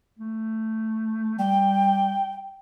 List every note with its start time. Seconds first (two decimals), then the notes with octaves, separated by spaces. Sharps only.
0.19 A3
1.39 G3 G5